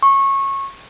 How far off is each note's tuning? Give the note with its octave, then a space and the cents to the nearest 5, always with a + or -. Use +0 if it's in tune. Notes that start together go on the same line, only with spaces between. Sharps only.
C#6 -20